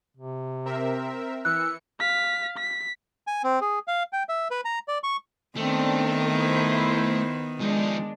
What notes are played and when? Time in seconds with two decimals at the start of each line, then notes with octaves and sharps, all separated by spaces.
0.17 C3
0.65 C4 A#4 E5
1.45 E3 E6 F#6 C#7
2.00 F5 B6
2.58 B6
3.27 G#5
3.44 C4
3.61 G#4
3.88 F5
4.13 G5
4.29 E5
4.51 B4
4.65 A#5
4.88 D5
5.03 C#6
5.57 D#3 A3 B3 C4 D4
6.34 E4 C5
7.60 F3 G#3 D4 D#4